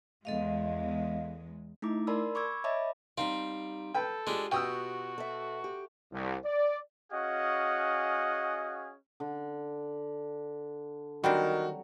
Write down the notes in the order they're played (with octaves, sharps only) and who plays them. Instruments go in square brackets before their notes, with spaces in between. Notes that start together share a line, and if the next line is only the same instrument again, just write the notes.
[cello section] E2 G#3 [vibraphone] A4 D#5 F5
[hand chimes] A3 D#4 E4 D6
A#4 D5 A5 B5 C6 E6
B5 C#6 D6 E6 G#6
C#5 D#5 E5 A5 B5 D6
[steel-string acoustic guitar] G3 D#4 F5 [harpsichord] C4
[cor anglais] A4 [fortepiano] B4 G5
[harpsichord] G#3 D4 [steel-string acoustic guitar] F4 G4
[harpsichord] B2 [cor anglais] F#4 [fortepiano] G5 D#6 E6
[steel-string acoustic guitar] A4 E5
G4
[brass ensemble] C2
D5
[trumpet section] C#4 F#4 G#4 D#5 F5 F#5
[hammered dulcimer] D3
[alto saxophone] D#3 [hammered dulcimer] F#3 [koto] G3 C4 D4 [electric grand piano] F#4